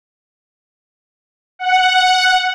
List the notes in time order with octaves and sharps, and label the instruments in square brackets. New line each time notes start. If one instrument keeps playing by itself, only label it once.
[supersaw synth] F#5